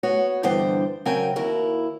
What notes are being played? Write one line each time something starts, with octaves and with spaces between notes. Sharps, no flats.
B3 F#4 C#5
G2 D3 E3 B3 C5 G5
C#3 F#3 C4 A#4 G5 G#5
D#2 E4 F#4 A#4